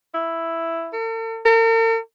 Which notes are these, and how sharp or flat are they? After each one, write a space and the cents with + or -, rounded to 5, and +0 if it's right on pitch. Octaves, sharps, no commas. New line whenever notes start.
E4 +5
A4 +45
A#4 -45